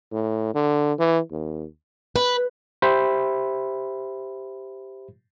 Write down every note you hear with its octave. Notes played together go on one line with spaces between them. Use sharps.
A2
D3
E3
D#2
B4
G4 C5 E5 B5